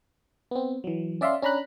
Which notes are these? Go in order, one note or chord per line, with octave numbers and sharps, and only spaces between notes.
B3 C4
E3 F#3
C#4 D5 E5 F5 C6
C#4 D4 A#5 B5 F#6